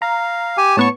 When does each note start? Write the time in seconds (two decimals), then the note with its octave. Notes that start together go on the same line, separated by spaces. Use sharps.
0.02 F5 A#5
0.57 G4 G#5
0.77 A2 B3 C#5 A5 C#6